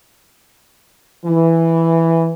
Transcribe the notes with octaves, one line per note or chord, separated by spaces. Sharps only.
E3